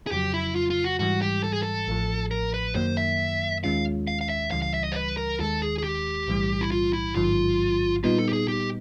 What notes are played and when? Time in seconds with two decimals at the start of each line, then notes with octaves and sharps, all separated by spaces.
0.07 G#4
0.11 F2 C#3 F#3 G4
0.34 E4
0.56 F4
0.70 F4
0.84 F#4
0.99 G#2 E3 G3 F#4
1.22 G4
1.44 A4
1.53 G#4
1.63 A4
1.88 A1 A2 F3
2.31 A#4
2.54 B4
2.75 F#2 D#3 F#3 A#3 C5
2.97 E5
3.64 D#2 D#3 G#3 C#4 F4 F5
4.08 F5
4.21 F5
4.29 E5
4.51 C#2 C#3 E3 G3 F5
4.62 F5
4.74 E5
4.84 D#5
4.92 C5
4.96 B4
5.17 A#4
5.40 D#2 D#3 G#3 A4
5.62 G#4
5.78 G#4
5.84 G4
6.28 B1 A2 E3 G3
6.61 E4
6.72 F4
6.93 E4
7.15 A1 G#2 D#3 F#3 F4
8.04 A#2 G3 B3 D#4 F4
8.18 A4
8.29 G4
8.33 G#4
8.48 G4